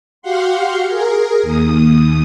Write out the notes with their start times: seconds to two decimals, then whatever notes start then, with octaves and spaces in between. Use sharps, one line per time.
0.22 F#4 G4 F5 F#5 C6
0.87 G#4 A#4
1.42 D#2 D#6